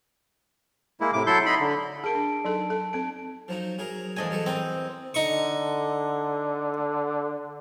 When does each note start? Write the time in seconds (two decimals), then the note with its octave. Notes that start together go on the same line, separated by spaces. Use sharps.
1.01 G#3 A#3 E4
1.13 A2 C3 D6
1.26 F#3 E4 A4 C6 G6
1.46 D#4 B5 C6
1.60 D3
2.04 G#4 A#4 A5 D7
2.15 D4
2.45 F#3 D#4 A4
2.70 A4
2.93 C4 A4 D7
3.48 F3 F#3 D#4
3.78 F#3 G#4 A#4
4.16 E2 F3 A3 D4 D#5 G#5
4.31 F#3 A4 B4
4.46 C4 A#4 D#5
5.14 D3 D#4 C#6